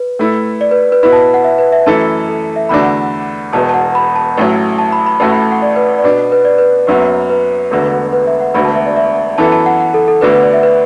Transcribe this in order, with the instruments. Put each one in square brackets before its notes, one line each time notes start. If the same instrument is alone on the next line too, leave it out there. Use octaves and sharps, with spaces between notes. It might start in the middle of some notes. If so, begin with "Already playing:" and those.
Already playing: [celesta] B4
[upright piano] A2 A3 E4 A4
[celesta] D5
B4
B4
[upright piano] B2 B3 E4 [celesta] B4
[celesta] A5
F#5
E5
B4
E5
[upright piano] F#2 E3 A3 E4 A4 [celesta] A5
[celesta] A4
E5
[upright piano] E2 D3 A3 D4 F#4 [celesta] B5
[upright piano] E1 E2 B2 [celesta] A5
[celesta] A5
F#5
B5
A5
[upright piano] A1 A2 F#3
[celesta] A5
B5
B5
[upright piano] A1 A2 A3 F#4 [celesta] A5
[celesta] B5
A5
F#5
D5
B4
D5
[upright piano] B2 B3 D4 [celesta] B4
[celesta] B4
D5
B4
[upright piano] F#1 F#2 F#3 B3
[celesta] B4
[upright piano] E1 D2 D3 B3 F#4
[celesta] B4
E5
F#5
[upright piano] E1 D2 D3 B3 F#4 [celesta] B5
[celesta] A5
E5
D5
E5
[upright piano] F#2 E3 B3 E4 A4 [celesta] A5
[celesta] A5
F#5
F#5
A4
A4
[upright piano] D2 D3 B3 D4 F#4 [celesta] B4
[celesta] B4
D5
E5
B4